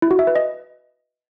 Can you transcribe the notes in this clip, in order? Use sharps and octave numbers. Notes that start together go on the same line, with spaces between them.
E4
F#4
E5
B4
D#5